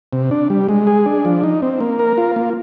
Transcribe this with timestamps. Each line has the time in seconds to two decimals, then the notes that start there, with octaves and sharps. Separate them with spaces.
0.13 C3
0.31 D4
0.50 G3
0.69 G#3
0.87 G#4
1.06 D4
1.25 F3
1.44 D#4
1.62 C4
1.80 A#3
1.99 A#4
2.18 F4
2.36 A#3